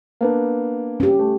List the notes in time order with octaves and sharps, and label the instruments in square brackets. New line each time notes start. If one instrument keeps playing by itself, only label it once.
[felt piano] A#3 B3 D4
[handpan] C#4 G4
[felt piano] A3